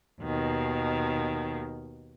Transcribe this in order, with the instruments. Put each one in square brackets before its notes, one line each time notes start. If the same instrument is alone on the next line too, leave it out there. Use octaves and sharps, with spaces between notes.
[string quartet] D#2 B2 D#3